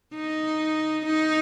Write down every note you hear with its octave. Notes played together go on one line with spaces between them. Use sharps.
D#4
D#4